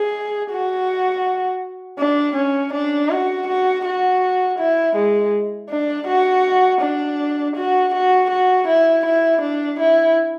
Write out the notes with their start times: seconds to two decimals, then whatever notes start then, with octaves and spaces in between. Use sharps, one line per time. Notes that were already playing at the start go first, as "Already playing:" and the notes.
Already playing: G#4
0.49 F#4
1.98 D4
2.36 C#4
2.73 D4
3.10 F#4
3.47 F#4
3.85 F#4
4.59 E4
4.96 G#3
5.70 D4
6.07 F#4
6.81 D4
7.56 F#4
7.94 F#4
8.30 F#4
8.67 E4
9.05 E4
9.41 D4
9.79 E4